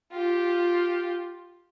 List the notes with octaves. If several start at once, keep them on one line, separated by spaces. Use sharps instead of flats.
F4 G4